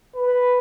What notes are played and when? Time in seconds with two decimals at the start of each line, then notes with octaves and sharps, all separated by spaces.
0.16 B4